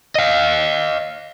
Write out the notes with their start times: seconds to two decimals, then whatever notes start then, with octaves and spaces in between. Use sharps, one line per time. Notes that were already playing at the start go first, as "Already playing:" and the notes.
0.16 D#5 F5